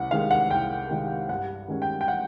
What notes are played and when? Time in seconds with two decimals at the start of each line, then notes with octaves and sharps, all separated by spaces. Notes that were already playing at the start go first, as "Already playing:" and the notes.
Already playing: C2 F#5
0.11 C3 D#3 G#3 F5
0.31 F#5
0.50 C2 G5
0.90 C3 D#3 G#3
1.29 G2 F#5
1.68 D#3 G#3 C#4
1.82 G5
2.01 G5
2.08 F#5